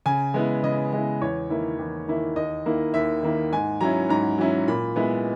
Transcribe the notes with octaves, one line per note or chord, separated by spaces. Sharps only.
C#3 G#5
G#3 B3 E4
C#3 D#5
G#3 B3 E4
E2 C#5
D#3 A#3 E4
E2
D#3 A#3 E4
D#2 D#5
D#3 A#3 E4
D#2 E5
D#3 A#3 E4
G#2 G#5
F#3 C#4 E4 A#5
G#2 A#5
F#3 C#4 E4
A#2 B5
G#3 B3 E4